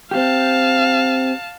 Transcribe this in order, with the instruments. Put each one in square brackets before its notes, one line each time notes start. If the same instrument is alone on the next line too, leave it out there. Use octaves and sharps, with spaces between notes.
[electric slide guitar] C4 G4 [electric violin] F5 A5